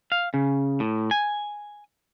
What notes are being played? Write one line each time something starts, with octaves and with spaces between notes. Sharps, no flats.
F5
C#3
A2
G#5